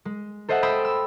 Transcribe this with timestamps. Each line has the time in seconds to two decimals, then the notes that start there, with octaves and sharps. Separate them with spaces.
0.05 G#3
0.49 A4 C5 D#5 E5 F#5
0.62 G5 B5 C6 D#6 E6
0.85 E6